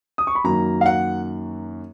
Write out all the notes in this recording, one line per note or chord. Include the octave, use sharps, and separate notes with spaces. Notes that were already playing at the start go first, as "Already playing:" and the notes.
D#6
C#6
B5
F#2 D#3 F#3 A#3 A#5
F5
F#5